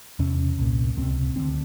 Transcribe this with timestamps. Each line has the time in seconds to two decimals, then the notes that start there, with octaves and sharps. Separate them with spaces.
0.19 E2 C3 C#4
0.58 C2 A#2
0.97 C#2 C3 C4
1.36 D2 D3 C4